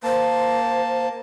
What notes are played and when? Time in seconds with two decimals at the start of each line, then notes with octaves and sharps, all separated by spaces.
0.04 A#3 C5 A5